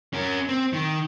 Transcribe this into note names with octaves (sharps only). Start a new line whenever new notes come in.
C#4 A#4
C4
D#3